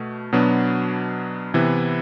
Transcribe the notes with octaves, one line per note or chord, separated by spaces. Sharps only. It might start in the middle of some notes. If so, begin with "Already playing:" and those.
Already playing: B2 A3
B2 F#3 B3 D4
C3 E3 B3 E4